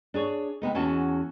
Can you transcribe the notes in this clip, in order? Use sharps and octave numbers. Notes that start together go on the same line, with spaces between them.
D4 G#4 C#5
C3 B3 D#4
E2 C#4 F#4 A5